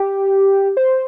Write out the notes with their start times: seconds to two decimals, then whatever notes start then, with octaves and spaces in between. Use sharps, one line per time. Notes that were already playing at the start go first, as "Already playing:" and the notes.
Already playing: G4
0.77 C5